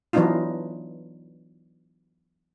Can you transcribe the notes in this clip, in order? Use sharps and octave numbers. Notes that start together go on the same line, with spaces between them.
E3 F#3 B3 D4 D#4 F4